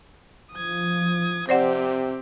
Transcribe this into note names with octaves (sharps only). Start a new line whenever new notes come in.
F3 D#6 G#6
C3 C4 G4 C5 D5 F#5